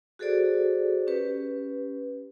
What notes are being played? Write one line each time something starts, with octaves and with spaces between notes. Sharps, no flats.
F#4 G#4 A4 C5 D5
C#4 G4 B4